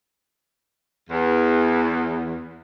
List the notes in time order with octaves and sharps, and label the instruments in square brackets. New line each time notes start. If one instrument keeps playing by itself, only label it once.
[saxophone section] E2